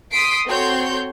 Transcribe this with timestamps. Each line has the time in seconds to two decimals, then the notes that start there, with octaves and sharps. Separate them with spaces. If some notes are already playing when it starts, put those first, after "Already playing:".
0.11 C6 D#6 B6 C7 D7
0.46 C4 F#4 A4 C#5 C6 G6